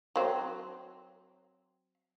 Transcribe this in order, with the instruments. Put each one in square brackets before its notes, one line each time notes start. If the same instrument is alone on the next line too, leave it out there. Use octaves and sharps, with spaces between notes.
[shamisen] F#3 C4